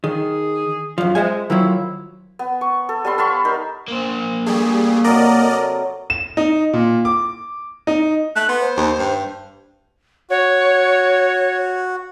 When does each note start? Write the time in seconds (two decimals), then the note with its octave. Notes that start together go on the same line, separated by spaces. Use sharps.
0.04 D#3 G#4
0.98 F#2 F3
1.15 G#3 C5 E5 G#5
1.50 D#3 F3 F#3 E4
2.39 B3
2.61 C#6
2.89 A4
3.05 G3 B3 B5 C6
3.18 F5 A5 B5 C#6
3.45 D#4 A#4
3.88 A#3 C5
4.46 G3 A3 G#4
5.04 C3 F#3 A#4 D5 D#5
6.10 E7
6.37 D#4
6.73 A#2
7.05 D6
7.87 D#4
8.36 A3 F#6
8.49 B3 C6
8.60 C5
8.77 D#2
8.98 G2
10.30 F#4 C#5